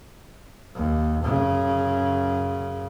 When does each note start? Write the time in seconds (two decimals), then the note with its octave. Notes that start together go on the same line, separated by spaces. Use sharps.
0.75 D#2
1.23 F#2 C#3